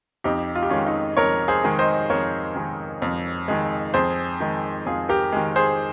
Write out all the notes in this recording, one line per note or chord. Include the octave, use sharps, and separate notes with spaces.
F2 D#4 G4
F4
G4
D#3 G#3 C#4 F4
D#4
F2 A#4 C#5
G#4 C5
D#3 G#3
C5 D#5
F2 A#4 C#5
D#3 G#3
F2
D#3 G#3
F2 G#4 C5
D#3 G#3
F2 F4 G#4
G4 A#4
D#3 G#3
G#4 C5